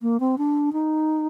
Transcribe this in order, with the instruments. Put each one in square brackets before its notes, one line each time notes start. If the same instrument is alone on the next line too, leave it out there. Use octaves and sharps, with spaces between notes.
[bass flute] A#3
C4
D4
D#4